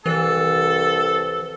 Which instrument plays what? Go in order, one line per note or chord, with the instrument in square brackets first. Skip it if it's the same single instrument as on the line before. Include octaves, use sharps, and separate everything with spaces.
[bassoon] C2 [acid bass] E3 [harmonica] A4